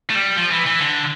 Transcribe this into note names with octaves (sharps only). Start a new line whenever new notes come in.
A3
G3
F3
E3
E3
D3